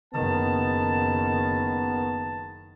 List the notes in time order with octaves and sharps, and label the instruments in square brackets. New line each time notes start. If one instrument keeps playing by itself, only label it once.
[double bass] F#1 D#3 [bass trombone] B3 [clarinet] A5